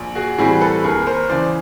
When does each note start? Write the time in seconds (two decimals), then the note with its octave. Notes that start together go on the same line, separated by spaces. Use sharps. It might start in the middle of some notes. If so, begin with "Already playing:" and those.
Already playing: A#1
0.15 F#4 G#4
0.38 A2 E3 G3 C4 F#4 G#4
0.61 A4 B4
0.84 D#2 G#4 A#4
1.01 B4
1.06 A#4 C5
1.29 C#3 E3 C5 D5